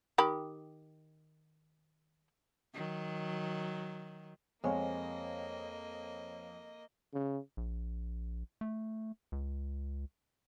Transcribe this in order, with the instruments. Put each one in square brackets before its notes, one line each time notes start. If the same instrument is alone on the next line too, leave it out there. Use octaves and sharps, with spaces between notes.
[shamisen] D#3 G4 B5
[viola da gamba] D#3 F#3
[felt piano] F2 C4 [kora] G#3 [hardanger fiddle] A#3 D#5 [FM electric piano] C5 C#5 F5
[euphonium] C#3
[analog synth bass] A#1
A3
C#2